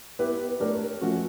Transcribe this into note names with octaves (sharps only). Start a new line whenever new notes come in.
B3 E4 G4 B4
A3 D4 G4 A#4 C#5
F3 A3 C#4 F#4